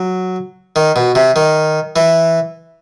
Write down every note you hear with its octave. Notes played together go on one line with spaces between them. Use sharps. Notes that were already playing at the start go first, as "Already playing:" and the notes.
Already playing: F#3
D#3
B2
C3
D#3
E3